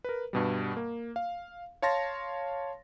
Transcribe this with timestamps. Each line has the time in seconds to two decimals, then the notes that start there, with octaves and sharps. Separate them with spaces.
0.04 A#4 B4
0.33 G2 B2 G3
0.77 A#3
1.16 F5
1.82 C#5 F5 A5 C6 A6 A#6